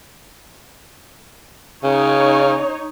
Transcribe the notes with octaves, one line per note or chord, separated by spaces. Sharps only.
C#3 D#4 C#5